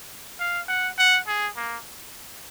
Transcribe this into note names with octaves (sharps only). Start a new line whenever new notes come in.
F5
F#5
F#5
G#4
A#3